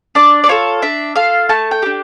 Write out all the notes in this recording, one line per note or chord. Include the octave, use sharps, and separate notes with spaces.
D4 D5
D5
F4 A4 C#5
D4 E5
F4 A4 F5
A3 A5
G5
D4 G4